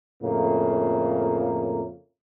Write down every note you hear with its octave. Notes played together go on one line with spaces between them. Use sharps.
F2 A2 C#3 A#3